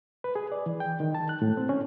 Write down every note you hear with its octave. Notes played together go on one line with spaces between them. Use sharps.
B4
G#4
D5
E3
G5
D#3
A5
F#6
A2
C4
C#4